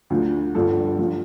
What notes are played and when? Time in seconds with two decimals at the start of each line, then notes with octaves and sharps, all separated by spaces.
0.10 D2 D3 F3
0.55 G1 G2 D3 F3 A4
0.99 F3